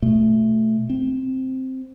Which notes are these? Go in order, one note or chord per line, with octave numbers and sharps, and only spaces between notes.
B2 A3
C4